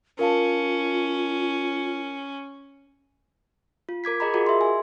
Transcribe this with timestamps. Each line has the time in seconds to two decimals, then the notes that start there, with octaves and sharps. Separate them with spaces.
0.19 C#4 F4 A#4 F5 A5
3.89 F4
4.04 A#4 D6 G#6 B6
4.20 G#4 D#5 A#5 B5
4.34 F4 F#4 G#4 A#4 D#5
4.46 E5 C6
4.61 G#5